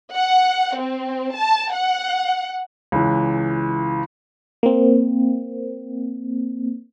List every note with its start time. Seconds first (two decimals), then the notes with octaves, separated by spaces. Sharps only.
0.14 F#5
0.78 C4
1.36 A5
1.74 F#5
2.92 C#2 E3
4.63 A#3 C4